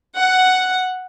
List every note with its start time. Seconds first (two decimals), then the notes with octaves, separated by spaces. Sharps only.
0.18 F#5